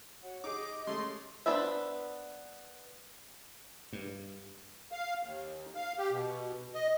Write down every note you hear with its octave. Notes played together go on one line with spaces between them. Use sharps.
F#4 C#5 F#5
D#4 G4 G#4 D#5 D6
G#3 A3 C#4 C6 D#6
B3 D4 B4 C5 E5
G2
F5
D#2
F5
G4
B2
D#5